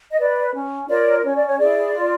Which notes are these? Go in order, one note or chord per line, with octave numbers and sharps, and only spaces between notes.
D#5
B4 D5
C#4
F4 A#4 C#5 D5
C#4 C#5
D5
C#5
E4 G#4 D5
F4